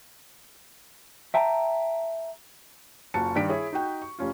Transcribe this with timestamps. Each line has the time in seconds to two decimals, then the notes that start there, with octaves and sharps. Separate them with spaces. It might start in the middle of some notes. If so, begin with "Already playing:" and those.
1.34 E5 G5 A5 A#5
3.14 F#1 F4 F#4 A5 C#7
3.35 G2 D#3 D5 B6 D7
3.49 E4 G#4 C#5
3.73 D#4 F#4 G5
4.02 C#6
4.19 F1 C#4 F4